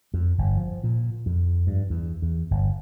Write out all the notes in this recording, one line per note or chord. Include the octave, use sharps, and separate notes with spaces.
F2
G1
F3
A#2
F2
G2
E2
E2
G1